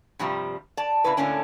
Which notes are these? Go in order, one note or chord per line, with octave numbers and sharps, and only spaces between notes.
G2 C3 F3 G3
D5 A5
C#3 E4 B4
A2 D3 A#3 C#4 D4